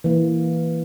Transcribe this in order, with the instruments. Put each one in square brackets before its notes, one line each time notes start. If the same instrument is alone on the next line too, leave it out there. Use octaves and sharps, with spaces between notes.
[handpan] E3 A#3